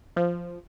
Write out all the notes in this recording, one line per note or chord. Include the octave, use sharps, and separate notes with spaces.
F3